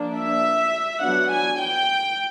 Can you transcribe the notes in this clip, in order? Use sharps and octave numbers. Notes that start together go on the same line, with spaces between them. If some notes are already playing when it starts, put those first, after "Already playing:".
Already playing: F3 A#3 D4
E5
F#3 B3 D4 F#5
G#5
G5